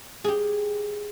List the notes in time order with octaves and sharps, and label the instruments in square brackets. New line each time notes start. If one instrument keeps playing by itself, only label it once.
[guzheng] G4 G#4